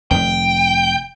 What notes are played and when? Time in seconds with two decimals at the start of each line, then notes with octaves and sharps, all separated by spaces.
0.11 F1 D#3 G5